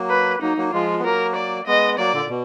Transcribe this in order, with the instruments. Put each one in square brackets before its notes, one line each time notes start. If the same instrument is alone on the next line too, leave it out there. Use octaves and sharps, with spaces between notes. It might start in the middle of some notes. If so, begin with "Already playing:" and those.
Already playing: [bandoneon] F#3 A#3
[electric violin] B4
[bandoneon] F#3 A#3 [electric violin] D#4
[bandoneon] F#3 A#3
[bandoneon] F3 G#3 [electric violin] F4
[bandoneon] B3
[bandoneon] F#3 A#3 [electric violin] A#4
[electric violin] D5
[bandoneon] G#3 B3 [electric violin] D#5
[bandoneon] F#3 A#3 [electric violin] D5
[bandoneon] A#2 D3
B2